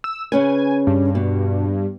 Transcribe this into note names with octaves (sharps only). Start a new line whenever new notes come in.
E6
C#3 C#4 B4 G#5
G2
B2